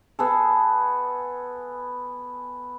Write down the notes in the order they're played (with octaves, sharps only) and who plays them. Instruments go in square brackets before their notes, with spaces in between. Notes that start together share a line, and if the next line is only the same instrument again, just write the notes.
[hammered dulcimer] B3 G#4 A4